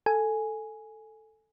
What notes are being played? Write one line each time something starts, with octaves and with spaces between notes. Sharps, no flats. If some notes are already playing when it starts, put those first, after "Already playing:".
A4 G#5